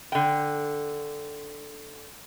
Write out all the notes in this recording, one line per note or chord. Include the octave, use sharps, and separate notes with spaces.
D3 G5